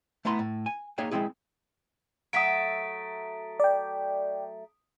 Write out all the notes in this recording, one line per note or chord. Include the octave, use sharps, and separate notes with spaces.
A3 B3 E4 A#5 C6
A2
G#5
A#3 D#4 G#4 C#5 E5 G5
G#3 A#3 C4 E4 G#4
F#3 A3 E5 D#6 B6 D7
D5 G5